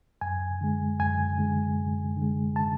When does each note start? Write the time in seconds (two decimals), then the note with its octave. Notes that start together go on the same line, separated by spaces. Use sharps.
0.21 F#2 G#5
0.61 D3 G#3
0.99 F#2 G#5
1.38 D3 G#3
1.78 F#2
2.16 D3
2.22 G#3
2.56 A5